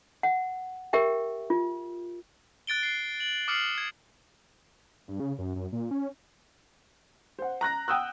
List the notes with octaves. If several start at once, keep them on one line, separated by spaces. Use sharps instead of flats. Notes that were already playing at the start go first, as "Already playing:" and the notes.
F#5
G4 A#4 E5 G5
F4
F#6 A6 D7 G7
C7
F#7
D6 D#6 F6 C7 C#7 F#7
G#6
G2
C#3
F#2
F#2
A#2
C#4
C5 F#5
A#5 F#6 A#6
F#5 G5 D#6 E6 F#6